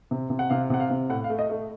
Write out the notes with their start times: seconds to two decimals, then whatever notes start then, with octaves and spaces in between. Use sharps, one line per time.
0.11 C3
0.30 C3
0.39 F#5
0.50 C3 F5
0.70 C3 F#5
0.80 F5
0.90 C3
1.10 A2 F#5
1.24 F5
1.30 A3
1.39 D#5
1.50 A3